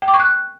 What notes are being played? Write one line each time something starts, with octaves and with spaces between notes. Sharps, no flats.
G5
D6
C#6
F#6